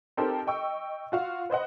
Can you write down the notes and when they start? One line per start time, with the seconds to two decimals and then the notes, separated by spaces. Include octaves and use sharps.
0.17 C4 D#4 G4 A4 A#4 C5
0.47 D#5 G5 C#6 E6
1.12 F4 F#4 F5
1.50 B4 C5 D#5 F#5